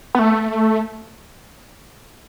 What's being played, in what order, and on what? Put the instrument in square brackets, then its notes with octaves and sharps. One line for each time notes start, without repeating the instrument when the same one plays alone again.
[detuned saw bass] B3
A3